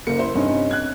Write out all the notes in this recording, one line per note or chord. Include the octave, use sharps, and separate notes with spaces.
F#1 A#3 C#7
E4 C5
G2 C3 C#4 D#4
F#6 G#6